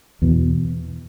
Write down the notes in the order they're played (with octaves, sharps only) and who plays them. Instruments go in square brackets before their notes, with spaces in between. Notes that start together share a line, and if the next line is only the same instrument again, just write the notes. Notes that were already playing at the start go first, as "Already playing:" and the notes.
[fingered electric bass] E2 B2 E3